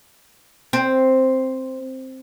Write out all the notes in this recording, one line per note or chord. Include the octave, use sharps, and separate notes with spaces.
C4